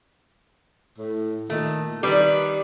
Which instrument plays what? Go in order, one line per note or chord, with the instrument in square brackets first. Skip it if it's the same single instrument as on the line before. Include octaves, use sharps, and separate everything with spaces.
[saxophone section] A2
[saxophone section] A#2 D#3 [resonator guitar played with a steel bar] A3
[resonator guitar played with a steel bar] D#3 G3 [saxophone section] B4 D5